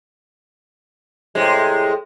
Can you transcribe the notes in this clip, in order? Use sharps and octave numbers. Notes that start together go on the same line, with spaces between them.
A2 C3 G#3